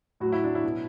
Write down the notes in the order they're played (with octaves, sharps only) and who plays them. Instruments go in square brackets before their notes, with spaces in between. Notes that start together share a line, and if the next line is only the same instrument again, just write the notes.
[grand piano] A2 F#3 F#4
E4
D4
E4
B2 F#3